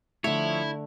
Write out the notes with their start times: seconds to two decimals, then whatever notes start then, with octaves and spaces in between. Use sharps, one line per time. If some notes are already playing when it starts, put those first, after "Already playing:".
0.24 D3 F3 A3 E4 C#5 E5